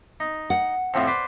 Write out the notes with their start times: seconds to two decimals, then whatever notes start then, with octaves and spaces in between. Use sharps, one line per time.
0.20 D#4
0.50 F#5
0.94 F2 A2 F3
1.07 B4 C5 D5